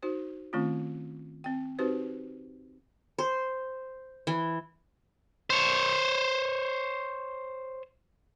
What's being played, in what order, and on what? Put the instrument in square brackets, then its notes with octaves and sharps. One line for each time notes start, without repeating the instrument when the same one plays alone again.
[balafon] D#4 F#4 C5
D#3 A3 C4 C#4 F4
C4 G5
C4 D#4 F#4 G4 B4 C5
[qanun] C5
E3
[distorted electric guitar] C5 C#5